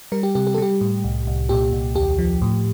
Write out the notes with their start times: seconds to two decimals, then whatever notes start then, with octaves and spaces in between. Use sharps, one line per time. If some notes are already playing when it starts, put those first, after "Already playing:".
0.12 G3 A#4
0.23 G4
0.35 C3 G4
0.47 G4
0.54 A4
0.58 G3 G4
0.81 A2
1.04 C2
1.27 C2
1.49 A#2 G4
1.73 C2
1.95 D#2 G4
2.18 F3
2.42 A2